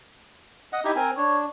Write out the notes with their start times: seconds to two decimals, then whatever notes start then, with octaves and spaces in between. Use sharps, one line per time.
0.73 D#5 F#5
0.85 D#4 E4 G4
0.96 C4 A#4 G#5
1.17 D4 C#5